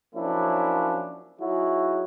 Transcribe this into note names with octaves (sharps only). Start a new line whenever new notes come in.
F3 F#3 A#3 C#4 D4 E4
F#3 D#4 E4 F#4 G#4